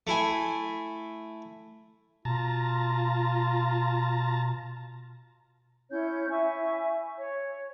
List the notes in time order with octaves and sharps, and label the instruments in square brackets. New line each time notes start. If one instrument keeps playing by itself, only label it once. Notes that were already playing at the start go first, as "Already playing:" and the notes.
[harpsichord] A3 E4 G#5
[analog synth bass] B2 [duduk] F4 [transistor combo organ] A5 A#5
[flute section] C#4 E4 C#5 G6
E4 E5 G#5 C#6
C#5